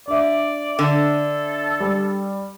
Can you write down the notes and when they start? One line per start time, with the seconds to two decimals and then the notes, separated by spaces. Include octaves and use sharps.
0.08 D4 D5 E5
0.79 D3 A4
1.80 G3